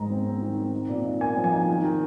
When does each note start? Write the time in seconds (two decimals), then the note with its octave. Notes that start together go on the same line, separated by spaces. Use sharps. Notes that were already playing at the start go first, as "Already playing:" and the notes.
Already playing: G#2 D#3 G#3 A#5
0.10 C4
0.26 C4
0.42 D#3
0.58 C4
0.73 D#4
0.89 A#2
1.05 D#4
1.21 A#3 G#5
1.37 F3
1.44 G#5
1.52 D#4
1.68 D#3
1.84 D#3